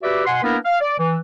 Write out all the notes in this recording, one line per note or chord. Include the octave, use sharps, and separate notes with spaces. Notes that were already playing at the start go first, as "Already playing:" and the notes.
F#4 G4 B4 D5 E5
B2 F#5 G#5 C6
A#3 B3 D4 E4 A#4 B4
F5
D5
E3